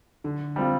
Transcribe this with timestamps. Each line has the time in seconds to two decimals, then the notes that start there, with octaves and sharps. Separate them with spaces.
0.24 D3
0.56 G3 C4 F4